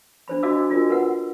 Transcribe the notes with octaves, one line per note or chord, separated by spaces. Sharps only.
D4 C5 B5
D4 F#4 D#5 F5 D6 E6
D4 F4 F#4 A#4 D#5
A#4 B4 F#5